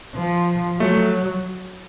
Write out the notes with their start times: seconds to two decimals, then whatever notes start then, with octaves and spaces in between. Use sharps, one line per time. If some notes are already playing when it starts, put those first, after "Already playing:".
0.15 F3
0.80 F#3 A3